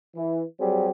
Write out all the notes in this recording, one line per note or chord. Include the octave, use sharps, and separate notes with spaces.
E3
F#3 G3 C4 G4 G#4